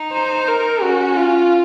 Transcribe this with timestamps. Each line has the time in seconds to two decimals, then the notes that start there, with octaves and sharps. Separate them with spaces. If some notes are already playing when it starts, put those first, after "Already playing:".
Already playing: D#4
0.13 C5
0.48 A#4
0.82 C#4 F#4
1.17 F4